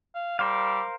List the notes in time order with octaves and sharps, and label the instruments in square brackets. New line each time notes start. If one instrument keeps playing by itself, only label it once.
[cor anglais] F5
[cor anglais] G3 [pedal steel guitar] A#4 C5 F5